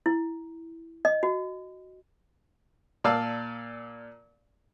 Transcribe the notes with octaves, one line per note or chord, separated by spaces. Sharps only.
E4
D#5
F#4
A#2 D5 F5 A5 E6